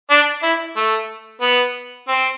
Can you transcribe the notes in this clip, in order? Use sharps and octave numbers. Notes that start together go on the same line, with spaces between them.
D4
E4
A3
B3
C4